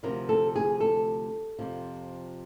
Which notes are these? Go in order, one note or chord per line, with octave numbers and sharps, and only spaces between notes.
D2 C3 F3 A#4
A4
G#4
A4
F2 C3 F3